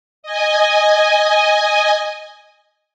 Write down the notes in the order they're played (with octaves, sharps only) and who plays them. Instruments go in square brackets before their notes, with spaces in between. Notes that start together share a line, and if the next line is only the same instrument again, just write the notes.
[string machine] D#5 G#5